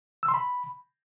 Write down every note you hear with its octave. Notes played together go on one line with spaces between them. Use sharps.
E6
C6
B5